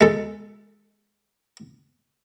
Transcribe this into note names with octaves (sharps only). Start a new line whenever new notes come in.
G#3 A4